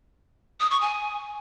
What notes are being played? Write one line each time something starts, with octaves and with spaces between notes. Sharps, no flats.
D#6
C#6
G#5